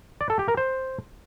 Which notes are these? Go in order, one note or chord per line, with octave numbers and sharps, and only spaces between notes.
D5
A4
G4
A#4
C5